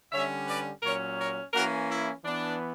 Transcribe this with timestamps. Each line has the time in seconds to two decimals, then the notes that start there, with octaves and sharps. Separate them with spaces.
0.12 D3 G3 C#4 C#5 E5
0.48 B4 D5
0.83 A#2 F#3 C#4 A#4 C#5
1.19 A#4 C#5
1.54 E3 A#3 C#4 F#4 A#4
1.90 E4
2.24 E3 B3 D4